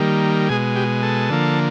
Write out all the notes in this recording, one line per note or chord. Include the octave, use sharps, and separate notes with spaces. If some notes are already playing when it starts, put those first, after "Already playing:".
Already playing: D#3 G3 A#3
B2 G#3 G#4
G4
A4
D3 F3 A#3